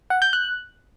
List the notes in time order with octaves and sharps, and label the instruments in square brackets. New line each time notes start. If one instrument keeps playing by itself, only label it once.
[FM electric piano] F#5
G6
F#6